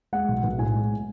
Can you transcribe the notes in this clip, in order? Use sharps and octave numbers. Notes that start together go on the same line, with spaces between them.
G#3 F#5
B1
B1
A2 G#5
G#3